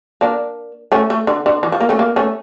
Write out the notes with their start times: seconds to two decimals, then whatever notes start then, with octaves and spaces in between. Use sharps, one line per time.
0.21 A#3 D4
0.92 A3 C#4
1.10 A3
1.27 D3
1.46 D3
1.63 E3
1.72 F3
1.80 A#3
1.89 A3 C#4
1.99 A#3
2.16 A3 C#4